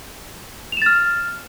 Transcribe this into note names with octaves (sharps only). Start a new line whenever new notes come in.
F6 A6 E7 F7